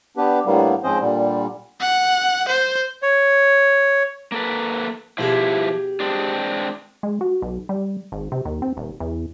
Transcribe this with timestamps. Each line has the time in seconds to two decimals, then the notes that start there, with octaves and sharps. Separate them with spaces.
0.17 B3 D4 G4 B4
0.45 A2 D3 G3 A#3 B3
0.83 G#2 F3 C4 C#4 C5 D#5
1.00 A#2 D3 G3
1.80 F#5
2.48 C5
3.03 C#5
4.32 A#3 A4 B4
5.18 B2 F3 E4 G4 G#4
6.00 G#3 C4 D4
7.03 G#3
7.21 F#4
7.42 B1
7.69 G3
8.12 G#1
8.32 C3
8.45 D#2
8.62 C4
8.77 D#1
9.00 E2